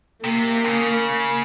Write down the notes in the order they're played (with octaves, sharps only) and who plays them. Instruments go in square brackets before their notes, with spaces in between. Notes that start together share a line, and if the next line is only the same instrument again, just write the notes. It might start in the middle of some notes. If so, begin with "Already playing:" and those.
[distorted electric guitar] C3 [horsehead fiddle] A#3
[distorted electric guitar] D3
C#3